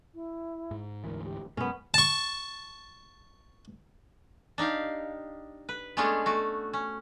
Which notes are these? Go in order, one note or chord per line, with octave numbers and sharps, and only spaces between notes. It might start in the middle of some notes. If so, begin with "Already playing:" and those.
E4
G#2
D2 G#2 E3 A#4
G4
F#2 B2 G#3 B3 C#4 A#4
A5 C#6
D4 D#4 G4 F5
B4
G#3 A3 B3 C#4 D4 G#4
A3 F#4
C#4